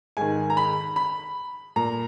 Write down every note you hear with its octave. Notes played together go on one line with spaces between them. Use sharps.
G#2 D#3 G#5
A#5
B5
B5
A#2 A#5